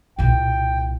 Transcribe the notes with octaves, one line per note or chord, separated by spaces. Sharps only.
C2 A#2 G5